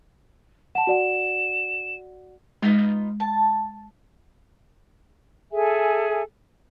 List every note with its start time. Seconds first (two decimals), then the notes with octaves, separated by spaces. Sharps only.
0.75 F#5 A5 E7
0.87 F#4 D5 F#5
2.62 G#3 B3 D#4 F4
3.20 A5
5.52 G#4 A4 E5 G#5